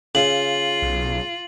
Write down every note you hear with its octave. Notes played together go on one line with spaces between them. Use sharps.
C#3 F4 F#7
B1